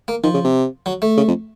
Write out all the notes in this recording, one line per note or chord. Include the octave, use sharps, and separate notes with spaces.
A#3
D#3 F3
C#3
C3
F#3
A3
C#3
F2